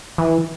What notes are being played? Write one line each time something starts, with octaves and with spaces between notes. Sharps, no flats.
E3